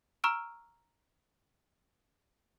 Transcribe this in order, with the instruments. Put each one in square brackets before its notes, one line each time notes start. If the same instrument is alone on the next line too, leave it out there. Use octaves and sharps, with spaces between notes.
[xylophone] A#5 C#6 E6 F6 D7